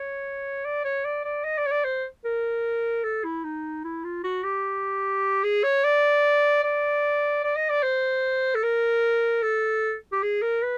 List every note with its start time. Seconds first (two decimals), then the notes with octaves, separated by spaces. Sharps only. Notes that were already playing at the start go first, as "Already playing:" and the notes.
Already playing: C#5
0.65 D5
0.85 C#5
1.05 D5
1.24 D5
1.44 D#5
1.58 D5
1.66 C#5
1.71 D5
1.84 C5
2.24 A#4
3.04 A4
3.24 E4
3.44 D#4
3.84 E4
4.04 F4
4.24 F#4
4.44 G4
5.43 G#4
5.63 C#5
5.84 D5
6.64 D5
7.44 D5
7.56 D#5
7.70 D5
7.83 C5
8.55 A4
8.63 A#4
9.42 A4
10.12 G4
10.22 G#4
10.42 A#4
10.63 B4